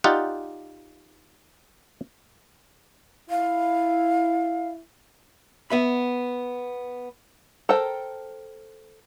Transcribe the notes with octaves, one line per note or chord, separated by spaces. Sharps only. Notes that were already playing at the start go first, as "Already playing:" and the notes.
D#4 F4 G4 D5 F#5
E4 F5
B3 E5 B5
A4 A#4 C5 G5